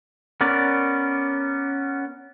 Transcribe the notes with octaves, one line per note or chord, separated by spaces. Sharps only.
B3 C#4 A#4 D5